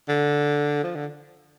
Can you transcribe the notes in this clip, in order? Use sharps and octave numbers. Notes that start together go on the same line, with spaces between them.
D3
F3
D3